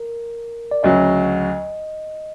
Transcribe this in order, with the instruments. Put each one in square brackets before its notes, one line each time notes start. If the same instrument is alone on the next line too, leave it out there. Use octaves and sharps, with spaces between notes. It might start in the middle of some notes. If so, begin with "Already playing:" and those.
Already playing: [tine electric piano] A#4
D5
[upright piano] D2 C#3 F#3 [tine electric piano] D#5